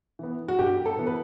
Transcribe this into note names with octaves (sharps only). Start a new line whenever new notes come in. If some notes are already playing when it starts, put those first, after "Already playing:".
E3 B3
F#4
G2 G4
A4
E3 B3
B4